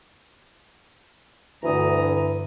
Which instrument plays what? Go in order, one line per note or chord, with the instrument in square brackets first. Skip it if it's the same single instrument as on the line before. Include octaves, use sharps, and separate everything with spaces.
[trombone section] D2 [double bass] G2 D3 [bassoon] E3 [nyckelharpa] A#5 D#6